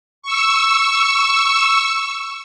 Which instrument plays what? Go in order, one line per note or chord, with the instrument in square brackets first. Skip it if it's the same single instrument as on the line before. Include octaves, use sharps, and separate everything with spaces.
[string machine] C#6 E6